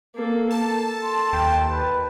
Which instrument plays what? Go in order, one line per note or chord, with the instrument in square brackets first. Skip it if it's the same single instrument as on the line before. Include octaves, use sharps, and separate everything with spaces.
[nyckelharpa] A#3 A4
[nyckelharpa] A4 [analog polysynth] A5
[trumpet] C6
[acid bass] D#2 [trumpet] G5
[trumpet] B4